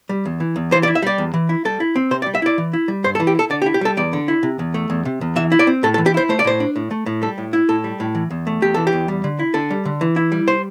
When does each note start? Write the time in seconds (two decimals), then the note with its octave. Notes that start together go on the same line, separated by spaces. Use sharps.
0.09 G3
0.25 E2
0.40 E3
0.56 E2
0.71 E3 C5
0.83 D5
0.88 E4
0.95 E5
1.02 G3 D5
1.18 E2
1.34 E3
1.49 E4
1.65 G3 A4
1.80 E4
1.96 C4
2.11 C3 C5
2.22 D5
2.26 G3
2.35 E5
2.42 E4 D5
2.58 E3
2.73 E4
2.88 G3
3.04 G2 C5
3.15 A4
3.20 E3
3.27 G4
3.35 E4 A4
3.50 D3 D5
3.62 G4
3.66 E4
3.74 G4
3.81 G3 A4
3.97 E2 D5
4.13 D3
4.28 E4
4.43 C3
4.59 E2
4.74 A3
4.90 E2
5.05 C3
5.21 E2
5.36 E3 E5
5.52 E4
5.59 D5
5.67 C4
5.83 A2 A4
5.94 A4
5.98 E3
6.06 G4
6.14 E4 C5
6.29 A3 C5
6.39 D5
6.44 A2 C5
6.60 D4
6.76 A2
6.91 A3
7.06 A2
7.22 G3 A4
7.38 A2
7.53 E4
7.69 A2 A4
7.84 G3
8.00 A2
8.15 E3
8.31 E2
8.47 A3
8.62 E2 G4
8.74 E3 A4
8.87 G4
8.92 E2
9.08 G3
9.24 D3
9.39 E4
9.54 D3 A4
9.70 G3
9.85 D3
10.01 E3
10.16 E4
10.32 G3
10.48 C5